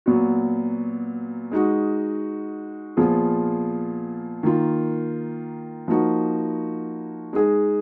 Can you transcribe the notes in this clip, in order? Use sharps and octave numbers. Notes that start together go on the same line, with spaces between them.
A#2 F#3 B3 F#4
G#3 D#4 F#4
A#2 F3 B3 F4 G#4
D#3 A#3 F4
F3 A#3 D#4 F#4
G#3 D#4 G#4